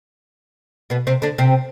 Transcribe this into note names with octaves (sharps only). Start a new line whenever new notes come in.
B2 B3
C3 C4
D3 D4
C3 C4